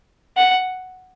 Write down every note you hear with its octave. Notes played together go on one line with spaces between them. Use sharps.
F#5